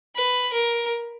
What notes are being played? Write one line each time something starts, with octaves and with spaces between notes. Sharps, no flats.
B4
A#4